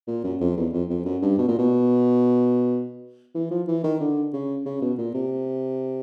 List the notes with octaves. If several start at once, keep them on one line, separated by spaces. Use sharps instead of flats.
A#2
F#2
F2
E2
F2
F2
F#2
G2
B2
A#2
B2
E3
F3
E3
D#3
D3
C#3
C#3
B2
A#2
C3